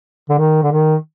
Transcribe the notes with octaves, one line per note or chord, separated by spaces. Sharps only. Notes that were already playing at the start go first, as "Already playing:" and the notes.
D3
D#3
D3
D#3